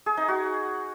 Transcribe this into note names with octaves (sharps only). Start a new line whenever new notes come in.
G#4
D#4
F#4